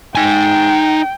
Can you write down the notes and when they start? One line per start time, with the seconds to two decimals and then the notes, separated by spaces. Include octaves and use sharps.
0.15 D#4 G5 G#5